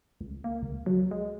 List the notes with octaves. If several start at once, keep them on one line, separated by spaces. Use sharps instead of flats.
C#2
A#3
C#2
F#3
G#3